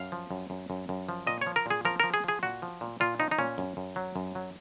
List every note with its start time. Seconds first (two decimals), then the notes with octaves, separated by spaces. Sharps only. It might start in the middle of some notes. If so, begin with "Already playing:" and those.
Already playing: F#2 F5
0.12 F3
0.31 F#2
0.50 F#2
0.70 F#2
0.89 F#2
1.09 F3
1.27 A#2 D#5
1.41 C#5
1.46 F3
1.56 A#4
1.66 A#2 G#4
1.85 F3 A#4
2.00 F3 A#4
2.14 G#4
2.24 F3 G#4
2.43 A#2 F#4
2.62 F3
2.81 A#2
3.00 A#2 F4
3.19 F3 D#4
3.31 D#4
3.39 A#2 C#4
3.58 F#2
3.77 F#2
3.96 F#3
4.16 F#2
4.35 F#3